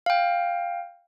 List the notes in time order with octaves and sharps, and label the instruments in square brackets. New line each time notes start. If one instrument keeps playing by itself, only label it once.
[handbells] F5 G5